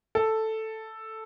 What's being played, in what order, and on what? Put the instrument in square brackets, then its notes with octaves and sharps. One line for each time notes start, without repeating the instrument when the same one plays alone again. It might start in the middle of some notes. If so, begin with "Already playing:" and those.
[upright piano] A4